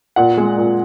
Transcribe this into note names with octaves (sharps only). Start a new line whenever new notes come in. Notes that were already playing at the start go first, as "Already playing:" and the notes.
A#2 F#5
G#3
A#2